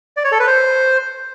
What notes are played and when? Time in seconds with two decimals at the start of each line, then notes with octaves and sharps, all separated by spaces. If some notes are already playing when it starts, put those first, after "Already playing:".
0.17 D5
0.24 C#5
0.32 A4
0.39 B4
0.47 C5